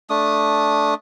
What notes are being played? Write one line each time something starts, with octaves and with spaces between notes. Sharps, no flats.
A3 D4 D#6